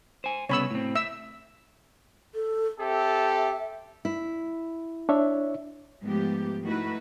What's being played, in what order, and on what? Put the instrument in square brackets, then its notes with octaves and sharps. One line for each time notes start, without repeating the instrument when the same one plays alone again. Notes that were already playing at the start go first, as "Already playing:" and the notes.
[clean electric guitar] C5 G#5
[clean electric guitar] C2 C#3 B3 [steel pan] C#5 B5 E6
[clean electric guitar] A2 C4
[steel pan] E5 E6
[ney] A4
[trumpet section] C4 G4 A4 [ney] E5
[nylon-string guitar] E4
[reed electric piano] D4 C#5 E5
[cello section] G#2 F3 A3 B3 G4
D#3 A3 D#4 E4 F#4 B4